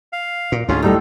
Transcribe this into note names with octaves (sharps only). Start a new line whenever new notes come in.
F5
A#2
D2 G#2 C#4 F4
A2 G3 D#4 A4